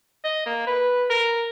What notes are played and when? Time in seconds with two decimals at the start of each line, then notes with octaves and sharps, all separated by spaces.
0.24 D#5
0.46 A#3
0.67 B4
1.10 A#4